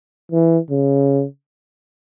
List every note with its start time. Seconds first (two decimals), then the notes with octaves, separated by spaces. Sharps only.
0.32 E3
0.71 C#3